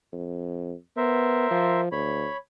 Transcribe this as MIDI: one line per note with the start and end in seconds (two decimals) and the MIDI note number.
0.13 0.74 41
0.97 1.49 59
0.97 1.81 70
0.97 1.81 72
0.97 1.81 76
1.51 1.89 53
1.92 2.27 38
1.92 2.37 73
1.92 2.37 83